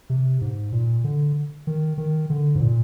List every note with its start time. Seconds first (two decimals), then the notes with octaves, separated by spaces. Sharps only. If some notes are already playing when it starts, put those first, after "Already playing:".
0.10 C3
0.41 G#2
0.72 A#2
1.04 D3
1.67 D#3
1.98 D#3
2.30 D3
2.55 G#2
2.60 A#2